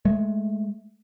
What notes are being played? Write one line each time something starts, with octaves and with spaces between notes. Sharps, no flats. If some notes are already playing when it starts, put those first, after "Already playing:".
G#3 A3